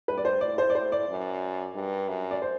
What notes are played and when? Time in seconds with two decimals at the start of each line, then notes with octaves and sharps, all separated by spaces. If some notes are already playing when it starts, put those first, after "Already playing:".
0.08 G2 B4
0.18 D5
0.25 C5
0.41 A2 D5
0.58 C5
0.70 D5
0.75 A2 C5
0.92 D5
1.09 F#2
1.75 G2
2.08 F#2
2.31 D5
2.42 C5